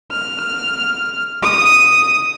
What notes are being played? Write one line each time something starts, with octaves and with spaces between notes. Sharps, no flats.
F6
D#6